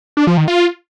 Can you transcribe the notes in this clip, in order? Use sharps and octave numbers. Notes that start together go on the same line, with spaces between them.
D4
F3
D#3
F4